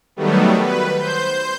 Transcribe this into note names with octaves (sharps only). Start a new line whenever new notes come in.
D#3 F#3 G3 A3 B3
B4
C5 G6